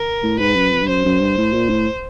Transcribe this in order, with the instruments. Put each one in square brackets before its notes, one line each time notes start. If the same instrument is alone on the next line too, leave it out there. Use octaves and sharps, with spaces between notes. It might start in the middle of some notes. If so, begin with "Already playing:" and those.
Already playing: [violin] A#4
[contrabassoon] A2
[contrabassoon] G#2 [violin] B4
[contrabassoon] F#2
F2
G2
[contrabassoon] F#2 [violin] C5
[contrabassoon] F#2
G2
A2
A#2
A2